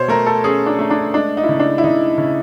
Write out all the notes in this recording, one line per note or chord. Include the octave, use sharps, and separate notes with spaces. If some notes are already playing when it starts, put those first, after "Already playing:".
Already playing: B2 C5 C#5
A3 A#4
A4
C#4 G#4
D4
A3
D4
G#3 D4
D#4
E4
C#3 D#4
D4
E4
C#3 D#4
C#3